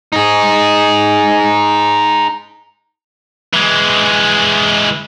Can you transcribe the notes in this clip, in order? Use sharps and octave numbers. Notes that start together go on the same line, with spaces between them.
D#4 G#4
E3 G#3